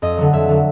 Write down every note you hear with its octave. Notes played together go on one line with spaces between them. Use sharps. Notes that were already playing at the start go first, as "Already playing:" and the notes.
F2 D#5
D3 F#3
F2 E5
D3 F#3